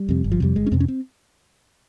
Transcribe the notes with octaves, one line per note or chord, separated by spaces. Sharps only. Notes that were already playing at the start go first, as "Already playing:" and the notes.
Already playing: G3
F2 C3
G1
F3
F2 C3 G3
G1 G#3
C#4
F2 C3 C4
C#4
C4